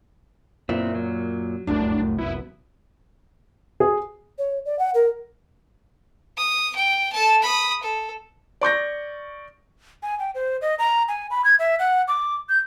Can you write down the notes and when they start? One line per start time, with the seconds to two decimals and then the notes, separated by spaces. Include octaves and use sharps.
0.69 F#2 A#2 B3 C4 E4
0.95 F#3
1.67 F1 C2 F#2 A2 D4
2.19 B3 E4
3.80 G#4
4.38 C#5
4.65 D5
4.79 F#5
4.94 A#4
6.37 D#6
6.75 G5
7.13 A4 A5
7.42 B5 D#6
7.83 A4
8.61 D5 C#6 G6 A#6
10.03 G#5
10.19 G5
10.35 C5
10.62 D#5
10.79 A#5
11.08 G#5
11.30 B5
11.45 G#6
11.59 E5
11.79 F#5
12.08 D6
12.49 G6